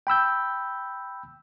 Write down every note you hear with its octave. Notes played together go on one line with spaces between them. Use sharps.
G5 B5 E6 G6